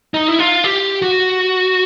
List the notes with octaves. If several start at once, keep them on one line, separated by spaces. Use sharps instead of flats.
D#4
E4
F4
G4
F#4